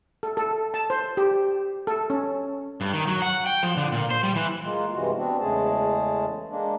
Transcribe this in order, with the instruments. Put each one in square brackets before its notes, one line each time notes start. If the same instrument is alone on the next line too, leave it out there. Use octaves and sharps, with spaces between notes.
[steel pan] A4
A4
A5
C5
G4
A4
C#4
[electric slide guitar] G2
D#3
F#3
F#5
G5
F3
D3
A#2
C5
G3
E3
[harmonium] G#3 A#3 F4
G2 C3 E3 G#3 F#4
B3 C4 D4 F#4
E2 C#3 G#3 A3 G#4 A5
G#3 A#3 D4